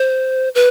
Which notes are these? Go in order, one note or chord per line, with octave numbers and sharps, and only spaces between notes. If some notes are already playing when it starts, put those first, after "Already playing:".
Already playing: C5
B4